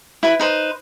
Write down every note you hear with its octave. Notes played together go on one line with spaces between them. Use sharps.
E4 B4 B5
D#4 B4 C5